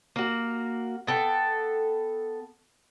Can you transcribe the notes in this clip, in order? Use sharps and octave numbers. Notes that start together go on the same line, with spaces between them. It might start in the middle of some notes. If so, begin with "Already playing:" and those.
A#3 F#4
B3 A4 G5